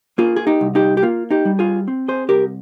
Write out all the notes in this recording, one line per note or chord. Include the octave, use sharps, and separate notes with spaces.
A#3 F4 G#4
G#4
D#4 G4
C2
D#4 G4
G4
A#3 F4
D#4 G4
G3
F4 G#4
C4
G#4 C5
C2 G4 A#4